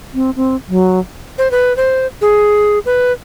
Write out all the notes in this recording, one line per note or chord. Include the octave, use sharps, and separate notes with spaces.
C4
C4
F#3
C5
B4
C5
G#4
B4